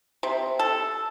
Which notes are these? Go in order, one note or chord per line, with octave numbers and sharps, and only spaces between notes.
C3
A4